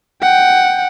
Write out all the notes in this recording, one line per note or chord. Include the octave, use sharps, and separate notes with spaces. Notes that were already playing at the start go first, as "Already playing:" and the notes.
F#5 G5